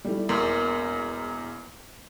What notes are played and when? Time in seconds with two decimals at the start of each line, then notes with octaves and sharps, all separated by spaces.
0.04 G3 A3 E4
0.29 E1 E2 A#3 C6 E6